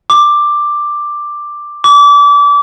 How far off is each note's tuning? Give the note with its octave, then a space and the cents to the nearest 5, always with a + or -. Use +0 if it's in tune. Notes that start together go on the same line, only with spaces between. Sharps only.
D6 +10
D6 -30